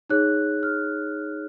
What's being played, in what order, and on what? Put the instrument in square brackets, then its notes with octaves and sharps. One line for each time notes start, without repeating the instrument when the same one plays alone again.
[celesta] D#4 G#4 C#5 F#6
F6